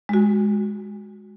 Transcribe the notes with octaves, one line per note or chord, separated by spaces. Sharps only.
G#3 F#4